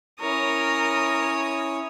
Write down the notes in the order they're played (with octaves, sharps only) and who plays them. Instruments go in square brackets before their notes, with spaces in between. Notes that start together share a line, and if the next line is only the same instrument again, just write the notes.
[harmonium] C#4 E4 [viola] A#4 [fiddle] C#5 D#6